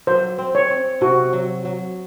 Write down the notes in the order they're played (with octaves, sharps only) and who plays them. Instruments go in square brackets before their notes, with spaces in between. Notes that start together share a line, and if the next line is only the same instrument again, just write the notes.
[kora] F#3 [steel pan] C5
[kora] C4
[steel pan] C#5
[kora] C4
[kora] C3 [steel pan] F#4
[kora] F#3
F#3